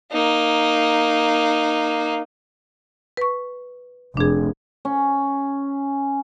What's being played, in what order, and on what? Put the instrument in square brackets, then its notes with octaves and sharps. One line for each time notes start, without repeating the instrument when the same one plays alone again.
[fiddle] A#3 D#4
[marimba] B4 C#6
[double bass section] F1 [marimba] D4 G#4
[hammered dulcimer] C#4